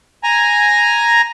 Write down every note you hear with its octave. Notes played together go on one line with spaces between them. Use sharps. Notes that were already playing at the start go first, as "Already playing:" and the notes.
G#5 A#5